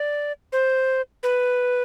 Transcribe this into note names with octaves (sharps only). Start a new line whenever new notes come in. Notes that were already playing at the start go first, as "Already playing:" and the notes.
Already playing: D5
C5
B4